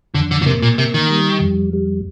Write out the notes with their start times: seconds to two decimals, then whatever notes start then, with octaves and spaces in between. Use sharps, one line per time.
0.14 F2 D3
0.31 D3
0.42 D3
0.46 C3 A#3
0.62 A#2
0.78 C3 A#3
0.94 D#3
1.10 G3
1.41 F2
1.73 G3